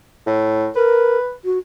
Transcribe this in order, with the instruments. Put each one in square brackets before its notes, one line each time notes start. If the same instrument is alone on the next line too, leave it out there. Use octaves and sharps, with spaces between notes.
[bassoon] A2
[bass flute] A#4 [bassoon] B4
[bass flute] F#4